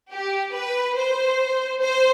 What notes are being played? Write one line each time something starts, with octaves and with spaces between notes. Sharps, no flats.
G4
B4
C5
C5